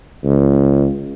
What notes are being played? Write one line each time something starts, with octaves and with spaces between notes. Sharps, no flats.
C#2